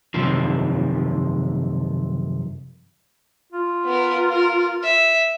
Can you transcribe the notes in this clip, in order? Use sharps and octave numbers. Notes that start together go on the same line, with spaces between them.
F#2 C3 D#3 F3
F4
B3 A#4
A#4
E5